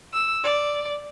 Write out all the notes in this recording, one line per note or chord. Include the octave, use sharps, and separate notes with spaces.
E6
D5